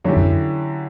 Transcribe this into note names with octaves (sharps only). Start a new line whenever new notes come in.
F#2 D3 F#3 C#4 E4 G4
F#2